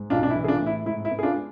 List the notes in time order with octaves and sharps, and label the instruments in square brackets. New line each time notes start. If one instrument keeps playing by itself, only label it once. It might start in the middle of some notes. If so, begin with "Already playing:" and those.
Already playing: [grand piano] G#2
B1 D4 F4
D4
E4
E3
G#4
D4 F4
A2
E4
G#2 E4
E4
B3
G#4
D4 F4
G#3